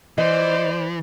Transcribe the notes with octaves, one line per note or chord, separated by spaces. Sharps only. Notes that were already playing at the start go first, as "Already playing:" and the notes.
E3 C5 D5 D#5